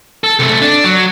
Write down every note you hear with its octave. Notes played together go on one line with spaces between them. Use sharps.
A4
C3 A3
D4
F#3